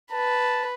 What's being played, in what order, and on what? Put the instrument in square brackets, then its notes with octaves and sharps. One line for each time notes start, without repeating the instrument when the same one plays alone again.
[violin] B4 [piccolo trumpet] A5